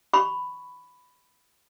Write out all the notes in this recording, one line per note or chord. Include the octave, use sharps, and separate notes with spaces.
B5 C#6